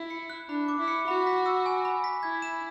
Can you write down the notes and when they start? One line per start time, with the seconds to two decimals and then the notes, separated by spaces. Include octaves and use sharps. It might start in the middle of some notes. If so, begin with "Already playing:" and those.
Already playing: E4
0.10 C#7
0.30 F#6
0.49 D4 B5
0.68 D6
0.79 E4
0.88 C#7
1.07 F#4 B5
1.27 B6
1.46 E6
1.66 G#5
1.85 B5
2.04 B6
2.23 E4 G#6
2.42 E7